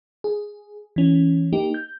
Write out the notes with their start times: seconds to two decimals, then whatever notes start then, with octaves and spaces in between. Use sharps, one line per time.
0.24 G#4
0.96 E3 C#4
1.53 A#3 D#4 G4
1.74 G6